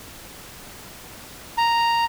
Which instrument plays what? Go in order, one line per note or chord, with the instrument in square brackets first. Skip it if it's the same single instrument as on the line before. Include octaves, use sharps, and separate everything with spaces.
[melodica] A#5